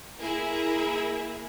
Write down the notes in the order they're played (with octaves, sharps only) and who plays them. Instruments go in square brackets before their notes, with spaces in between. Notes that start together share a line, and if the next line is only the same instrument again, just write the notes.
[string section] A#3 E4 G#4 A#4